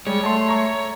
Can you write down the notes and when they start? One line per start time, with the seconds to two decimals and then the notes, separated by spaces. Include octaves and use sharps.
0.07 G3 G#3 C#5
0.24 A3 A5 C6
0.48 A#5 C#6